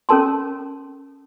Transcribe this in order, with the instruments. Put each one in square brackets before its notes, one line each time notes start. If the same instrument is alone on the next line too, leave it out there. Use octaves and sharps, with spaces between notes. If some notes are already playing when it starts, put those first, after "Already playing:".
[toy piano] C#4 A4 A#4 A5 C6